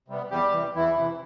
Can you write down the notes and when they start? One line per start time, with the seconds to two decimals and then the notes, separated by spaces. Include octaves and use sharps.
0.08 C3 G3 B3
0.30 E2 G3 G4
0.52 C3 E3
0.75 E2 E3 E4
0.97 C3 E3